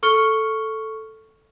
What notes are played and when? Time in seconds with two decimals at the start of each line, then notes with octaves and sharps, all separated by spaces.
0.03 A4 C#6 F6 C#7 G7